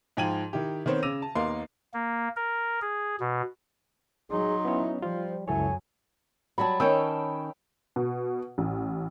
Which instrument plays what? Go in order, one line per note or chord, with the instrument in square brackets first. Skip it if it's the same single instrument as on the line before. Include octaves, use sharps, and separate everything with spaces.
[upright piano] G#2 F3 G5 G#6 D#7 F#7
D#3 E4 G4
D#3 B3 C4 C5 C#5
C#3 D6 E6 A#6 D#7 F7
A5
D#2 A#3 B3 D#4 C6 C7
[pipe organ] A#3
A#4
G#4
B2
[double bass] F#3 D#4 [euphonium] G#4 [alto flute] C6
[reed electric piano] B3 C#4 C#5 [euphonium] E4
[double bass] F3 [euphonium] G3 [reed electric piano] F4 [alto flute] C5
[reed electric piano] C#2 A4 C#5 [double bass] F#2 F#3 [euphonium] E4 [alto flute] G#5
[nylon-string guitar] F#3 G3 F#4 [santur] A5 B5
[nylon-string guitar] D#3 C#4 [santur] C#5 G5 E6
[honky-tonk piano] B2
A1